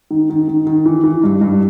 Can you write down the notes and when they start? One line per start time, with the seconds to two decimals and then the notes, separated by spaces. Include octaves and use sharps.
0.11 D#3
0.30 D#3
0.48 D#3
0.67 D#3
0.86 E3
1.04 E3
1.24 G2
1.41 G2